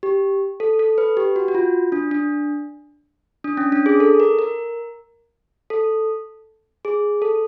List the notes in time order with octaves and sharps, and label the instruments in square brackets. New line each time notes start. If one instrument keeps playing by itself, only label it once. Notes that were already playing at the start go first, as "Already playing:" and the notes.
[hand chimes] G4
A4
A4
B4
G4
F#4
F#4
F4
D4
D4
D4
C#4
D4
G#4
A4
A#4
A#4
A4
G#4
A4